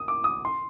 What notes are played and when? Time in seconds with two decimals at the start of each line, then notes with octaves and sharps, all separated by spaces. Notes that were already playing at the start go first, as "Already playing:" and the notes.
Already playing: D#6
0.08 D6
0.24 D#6
0.45 C6